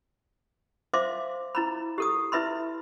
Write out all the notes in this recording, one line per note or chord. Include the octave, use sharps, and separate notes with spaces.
C5 E5 F5 C6 D6
E4 A#5 B5
G4 A4 D#6
E4 B4 E5 B5 C6